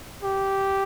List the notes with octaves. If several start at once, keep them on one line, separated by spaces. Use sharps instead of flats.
G4